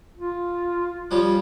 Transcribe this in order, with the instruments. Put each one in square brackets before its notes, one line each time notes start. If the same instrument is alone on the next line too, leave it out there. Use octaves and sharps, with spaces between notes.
[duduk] F4
[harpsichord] F3 G3 C#4